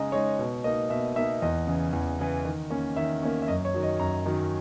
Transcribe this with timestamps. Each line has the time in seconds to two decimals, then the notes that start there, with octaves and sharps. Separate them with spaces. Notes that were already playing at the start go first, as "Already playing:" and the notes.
Already playing: C#3 G#3 D#4 D#5 A#5
0.12 G#3 D#4 C#5
0.39 B2
0.64 A#3 D#4 D#5
0.90 B2 E5
1.16 A#3 D#4 E5
1.42 E2 D#5
1.67 C#3 E3
1.93 E2
2.19 C#3 E3
2.45 D#3
2.70 A#3 C#4
2.96 D#3 E5
3.22 A#3 C#4
3.42 E5
3.48 F#2 D#5
3.65 C#5
3.74 D#3 F#3
3.83 D#5
4.00 F#2 A#5
4.26 D#3 F#3